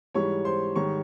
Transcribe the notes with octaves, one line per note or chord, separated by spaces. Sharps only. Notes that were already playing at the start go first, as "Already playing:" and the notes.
G#2 E3 G3 C#5 C#6
C5 C6
G#2 D#3 G3 C#5 C#6